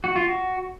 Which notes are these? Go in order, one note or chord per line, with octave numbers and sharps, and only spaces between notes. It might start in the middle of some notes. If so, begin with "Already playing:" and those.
F#4
F4
F#4